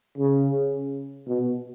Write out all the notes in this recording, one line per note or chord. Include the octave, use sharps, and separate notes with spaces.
C#3
B2